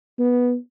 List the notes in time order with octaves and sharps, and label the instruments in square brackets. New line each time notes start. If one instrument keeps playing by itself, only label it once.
[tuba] B3